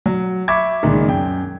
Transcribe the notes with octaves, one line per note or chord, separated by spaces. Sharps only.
F#3
E5 B5 C#6 D6 G#6
C#2 A#2 D#3
F#2 G5